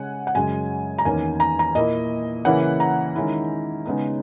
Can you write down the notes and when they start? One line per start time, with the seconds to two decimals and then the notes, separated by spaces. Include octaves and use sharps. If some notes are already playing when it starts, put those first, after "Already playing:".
Already playing: C#3 G#3 C#4 F#5 G#5
0.27 F#5
0.35 F#2 C#3 G#3 G#5
0.99 A#5
1.05 E2 D#3 A#3 C#4 G#5
1.40 A#5
1.59 A#5
1.75 A#2 A#3 E4 D#5
2.45 C#3 E3 A#3 C#4 E4 F#5
2.80 A#5
3.15 D#3 G#3 C#4 E4
3.85 C#3 G#3 B3 D#4